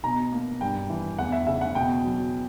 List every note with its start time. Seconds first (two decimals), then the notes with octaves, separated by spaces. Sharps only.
0.04 B2 A#5
0.32 A#3
0.61 G2 G5
0.90 E3
1.18 E2 F#5
1.32 E5
1.47 C#3 E5
1.61 F#5
1.75 B2 G5
2.04 F#3